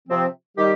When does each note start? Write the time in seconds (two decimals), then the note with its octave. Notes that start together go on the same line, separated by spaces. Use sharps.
0.08 C3 F3 C4
0.56 D#3 G3 D#4 G4